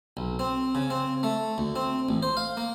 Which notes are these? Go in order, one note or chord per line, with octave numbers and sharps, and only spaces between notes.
B1
C4
C#3
C4
A3
D2
C4
A1
C5
F5
A#3